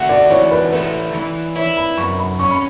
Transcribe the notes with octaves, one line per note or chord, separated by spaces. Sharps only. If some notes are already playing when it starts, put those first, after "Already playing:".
Already playing: A3 F#4 E5 F#5
D5
E3 C#5
B4
A3 B4
E3
E4 C#5
B5
F#2 C#6
B5
C#4 C#6
B5